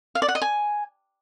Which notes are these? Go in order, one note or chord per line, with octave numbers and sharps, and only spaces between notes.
F5
D5
F#5
D#5
G#5